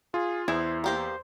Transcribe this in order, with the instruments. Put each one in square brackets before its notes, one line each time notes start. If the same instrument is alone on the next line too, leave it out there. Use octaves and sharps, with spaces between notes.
[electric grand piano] F4 [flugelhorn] G#4
[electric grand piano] E2 [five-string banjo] B3 G#4 [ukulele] E4 [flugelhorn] C5
[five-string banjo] A#3 G4 A#4 [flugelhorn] C5